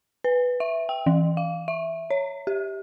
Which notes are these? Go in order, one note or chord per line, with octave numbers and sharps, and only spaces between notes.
B4
E5
G5
E3
F5
E5
C#5
G4